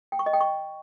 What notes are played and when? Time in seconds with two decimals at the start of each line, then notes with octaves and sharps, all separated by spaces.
0.12 G5
0.19 C#6
0.26 D#5
0.33 G5
0.41 C#6